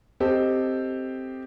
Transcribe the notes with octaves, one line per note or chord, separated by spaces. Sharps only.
C4 G4 A4 C5 D#5